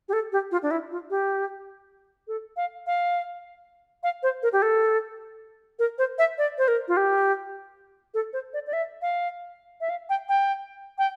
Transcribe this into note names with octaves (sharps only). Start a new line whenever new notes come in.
G4
A4
G4
F4
D4
E4
F4
G4
A4
F5
F5
F5
C5
A#4
G4
A4
A#4
C5
E5
D5
C5
A#4
F4
G4
A4
C5
D5
D5
E5
F5
E5
F5
G5
G5
G5